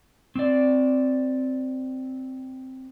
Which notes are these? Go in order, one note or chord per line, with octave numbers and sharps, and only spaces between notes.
C4 D5